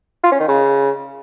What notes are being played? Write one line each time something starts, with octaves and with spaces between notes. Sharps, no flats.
F4
C#4
D#3
C#3